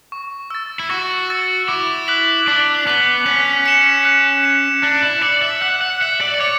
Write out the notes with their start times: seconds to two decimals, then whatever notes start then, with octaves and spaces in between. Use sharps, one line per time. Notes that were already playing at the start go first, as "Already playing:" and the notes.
0.12 C#6
0.50 E6 A6
0.79 E4
0.90 F#4 C#6
1.30 E6 A6
1.68 E4 D6
2.08 F#6 B6 F#7
2.47 D4 D6
2.87 B3 F#6 B6 F#7
3.26 C#4 F#6
3.66 C#7 E7
4.05 F#6
4.43 C#7 E7
4.83 D4 F#6
5.03 E4
5.22 D5 C#7 F#7
5.42 E5
5.62 F#5 F#6
5.81 F#5
6.01 E5 C#7 F#7
6.21 D5
6.34 D5
6.40 C#5 D6